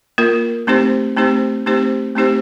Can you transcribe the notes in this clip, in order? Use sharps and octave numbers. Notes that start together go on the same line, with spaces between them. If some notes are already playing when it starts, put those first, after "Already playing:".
A#3 F4 A#4
A3 C4 D#4 G4 C5
A3 C4 D#4 G4 C5
A3 C4 D#4 G4 C5
A3 C4 D#4 G4 C5